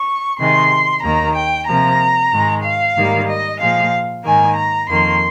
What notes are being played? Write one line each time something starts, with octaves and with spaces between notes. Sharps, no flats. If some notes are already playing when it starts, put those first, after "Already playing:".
Already playing: C#6
C3 D#3 G#3 C6
D#2 D#3 A#3 A#5
G5
C3 F3 A#3 A#5
G#2 D#3 G#3
F5
G#2 D#3 G3 A#3
D#5
A#2 F3 G#3 F5
G#2 D#3 A#3 G#5
A#5
F2 D#3 A#3 C6